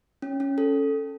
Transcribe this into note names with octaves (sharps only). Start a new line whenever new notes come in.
C#4
C#4
A4